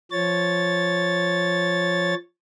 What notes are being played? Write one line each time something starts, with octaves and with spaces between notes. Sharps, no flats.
F3 C#5 A6